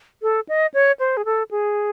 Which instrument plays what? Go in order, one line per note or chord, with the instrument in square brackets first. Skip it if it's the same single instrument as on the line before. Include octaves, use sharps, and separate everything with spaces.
[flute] A4
D#5
C#5
C5
G#4
A4
G#4